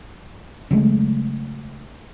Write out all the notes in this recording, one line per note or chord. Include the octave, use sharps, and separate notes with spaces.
C#3 F#3 G#3 A3